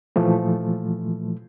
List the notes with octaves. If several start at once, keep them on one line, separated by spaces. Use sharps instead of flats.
A#2 E3 F3 A3